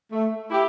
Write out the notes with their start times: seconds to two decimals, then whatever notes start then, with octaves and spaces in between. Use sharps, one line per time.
0.12 A3
0.50 E4 G4